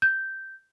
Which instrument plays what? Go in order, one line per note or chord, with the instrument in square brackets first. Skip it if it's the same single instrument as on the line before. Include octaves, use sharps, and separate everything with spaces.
[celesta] G6